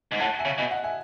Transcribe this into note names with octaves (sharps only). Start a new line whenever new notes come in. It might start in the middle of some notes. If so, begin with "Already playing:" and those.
G#2
A2 F#5 A5
E5 G#5
C#3
B2 E5 G#5
D#5 F#5
E5 G#5